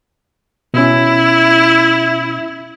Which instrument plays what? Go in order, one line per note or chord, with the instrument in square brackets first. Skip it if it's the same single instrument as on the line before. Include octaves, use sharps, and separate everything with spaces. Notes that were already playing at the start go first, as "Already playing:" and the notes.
[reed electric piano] B2 C#4 [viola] E4